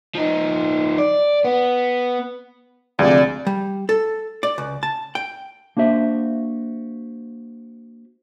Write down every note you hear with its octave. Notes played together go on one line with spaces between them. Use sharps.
F3 D#4
D5
B3
D2 C3 F3 G#3 D5
G3
A4
D5
C#2
A5
G5
A#3 D4 F#4 C5 E5